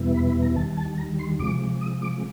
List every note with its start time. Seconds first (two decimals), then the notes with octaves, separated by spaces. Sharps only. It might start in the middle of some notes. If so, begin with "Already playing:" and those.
Already playing: E2 B2 G3 B3 E4
0.15 B5
0.28 B5
0.42 A#5
0.56 D#2 D#3 G3 A5
0.77 A5
0.98 A#5
1.19 C6
1.39 C3 F3 G#3 D6
1.81 D#6
2.02 D6